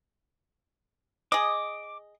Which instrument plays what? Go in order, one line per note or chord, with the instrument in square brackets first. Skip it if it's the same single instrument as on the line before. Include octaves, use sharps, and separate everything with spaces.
[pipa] G#4 D#5 [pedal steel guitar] D6